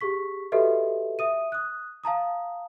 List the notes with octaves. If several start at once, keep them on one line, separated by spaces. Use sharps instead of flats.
G4 G#4 C#6 B6
F#4 G4 A4 B4 D#5 E5
E5 D#6 D#7
D#6 F#6
F5 A5 A#5 D#6